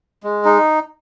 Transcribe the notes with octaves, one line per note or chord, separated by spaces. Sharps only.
G#3
D#4